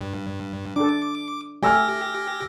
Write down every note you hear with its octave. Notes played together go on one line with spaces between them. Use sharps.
G2
D4 A4 D6
A3 G4 G#5 E6 F6 A#6